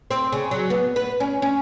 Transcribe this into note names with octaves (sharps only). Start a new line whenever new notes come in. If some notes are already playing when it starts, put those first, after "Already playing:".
C4
C#3
F#3
B3
B4
C#4
C#4